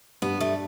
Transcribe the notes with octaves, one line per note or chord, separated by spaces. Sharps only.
G2 B3
G3 A3